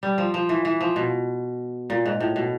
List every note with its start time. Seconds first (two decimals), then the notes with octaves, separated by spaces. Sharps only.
0.03 G3
0.18 F3
0.34 F3
0.49 E3
0.65 E3
0.81 F3
0.96 B2
1.90 A#2
2.06 G#2
2.20 A2
2.36 B2